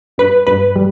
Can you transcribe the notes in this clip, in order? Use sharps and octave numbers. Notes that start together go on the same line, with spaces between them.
G2 B4
G2 B4
G3